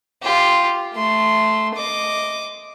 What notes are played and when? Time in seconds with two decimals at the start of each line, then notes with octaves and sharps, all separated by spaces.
0.23 F4 G4
0.94 A3 C6
1.75 D#5 D6